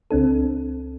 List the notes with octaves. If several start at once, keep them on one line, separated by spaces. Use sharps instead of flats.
C#2 C4 D4 A4